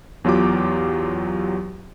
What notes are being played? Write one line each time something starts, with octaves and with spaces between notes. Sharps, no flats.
E2 F#3 F4 G4 D6